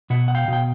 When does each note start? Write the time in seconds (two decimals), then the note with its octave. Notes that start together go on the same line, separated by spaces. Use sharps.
0.10 B2 E5 F#5
0.28 F#5
0.35 F5 G5
0.48 B2 G5